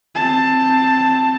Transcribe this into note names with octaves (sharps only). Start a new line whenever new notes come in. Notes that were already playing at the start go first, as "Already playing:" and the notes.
C4 A5